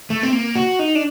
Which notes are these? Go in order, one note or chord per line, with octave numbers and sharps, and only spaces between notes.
A3
C4
A#3
F#4
D#4
D4